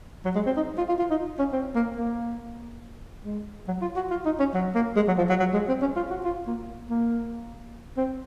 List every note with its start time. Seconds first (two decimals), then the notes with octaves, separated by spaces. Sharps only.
0.25 F#3
0.35 G#3
0.46 C4
0.57 D#4
0.78 F4
0.89 F4
0.99 F4
1.10 D#4
1.39 C#4
1.53 C4
1.75 A#3
1.96 A#3
3.25 G#3
3.68 F#3
3.82 F4
3.96 F#4
4.11 F4
4.26 D#4
4.39 C#4
4.54 F#3
4.75 A#3
4.96 G#3
5.08 F#3
5.18 F3
5.29 F#3
5.40 F#3
5.53 G#3
5.69 C4
5.82 C#4
5.96 F4
6.11 F#4
6.25 F4
6.47 A#3
6.90 A#3
7.97 C4